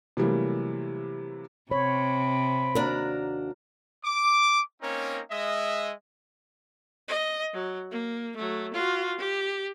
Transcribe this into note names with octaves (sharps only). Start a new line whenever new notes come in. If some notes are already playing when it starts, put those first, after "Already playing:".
C3 E3 F#3 G3 A3 A#3
C3 C4 C#5 B5
D#2 D4 F#4 A#4
D6
A#3 C4 C#4 D#4 A#4 C#5
G#3 D#5 E5
D#5
F#3
A#3
F#3 A3
F4 F#4
G4